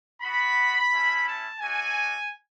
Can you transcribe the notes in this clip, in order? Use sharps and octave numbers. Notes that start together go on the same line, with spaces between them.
B3 F#4 B5
A3 C#4 E4
A5
A3 D4 F#4 G#5